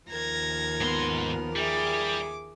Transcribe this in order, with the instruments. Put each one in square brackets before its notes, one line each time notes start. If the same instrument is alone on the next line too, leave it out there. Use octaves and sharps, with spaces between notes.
[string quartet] D#2 F3 A#4 [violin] G#6 A#6
[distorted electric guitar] G#2 C6 [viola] B3
[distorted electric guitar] G3 [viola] G#4 E5 [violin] D6